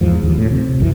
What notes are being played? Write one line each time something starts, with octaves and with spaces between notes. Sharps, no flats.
E2 G#2 F3
D#2 F3
A2
C3
C2 F#2 E3